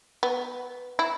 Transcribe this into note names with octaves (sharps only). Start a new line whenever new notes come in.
B3
E4